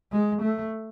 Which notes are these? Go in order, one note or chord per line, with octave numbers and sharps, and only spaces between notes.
G#3
A3